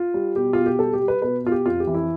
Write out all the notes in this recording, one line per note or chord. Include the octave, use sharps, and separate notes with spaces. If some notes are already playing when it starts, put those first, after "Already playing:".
Already playing: F4
G3
B2 G4
B2 F4
G4
G3 A4
G4
G3
B4
B2 B4
B2 F4
G4
F2 F4
G4
E3
E4